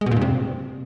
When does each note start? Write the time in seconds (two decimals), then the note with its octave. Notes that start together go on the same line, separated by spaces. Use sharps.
0.01 G#3
0.06 B2
0.11 A#2
0.16 G2
0.21 C3